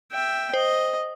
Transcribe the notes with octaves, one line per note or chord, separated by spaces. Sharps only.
E5 G5
C5 D#5